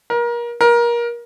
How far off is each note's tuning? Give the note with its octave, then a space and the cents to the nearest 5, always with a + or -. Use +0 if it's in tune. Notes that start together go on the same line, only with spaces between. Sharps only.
A#4 +30
A#4 +25